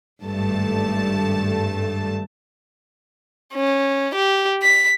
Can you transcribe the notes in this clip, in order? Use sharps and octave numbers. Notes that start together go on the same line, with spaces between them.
G#1 G2 A3 A5
C#4
G4
B6